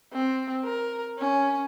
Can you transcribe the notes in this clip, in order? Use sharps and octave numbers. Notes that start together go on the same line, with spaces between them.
C4
A#4
C#4